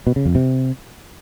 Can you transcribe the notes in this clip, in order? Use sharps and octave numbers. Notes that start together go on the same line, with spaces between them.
B2
C#3
F2
C3